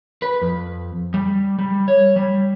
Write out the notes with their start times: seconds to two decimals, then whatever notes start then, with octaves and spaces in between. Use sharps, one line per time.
0.22 B4
0.41 F2
1.14 G3
1.59 G3
1.88 C#5
2.16 G3